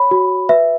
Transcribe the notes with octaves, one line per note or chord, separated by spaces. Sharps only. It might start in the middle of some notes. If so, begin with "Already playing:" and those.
Already playing: C#5 B5
F#4
B4 E5